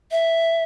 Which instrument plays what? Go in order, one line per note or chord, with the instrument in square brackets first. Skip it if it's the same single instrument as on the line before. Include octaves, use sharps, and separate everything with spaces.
[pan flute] E5